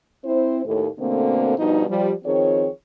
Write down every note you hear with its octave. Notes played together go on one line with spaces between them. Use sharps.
C4 E4 C5
D#2 A2 A4
B2 D3 A3 A#3 C4
G2 B2 F3 D#4
F3 G3
D#3 F3 C4 G#4 C#5